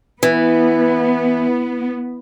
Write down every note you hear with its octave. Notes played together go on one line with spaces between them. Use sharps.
E3 B3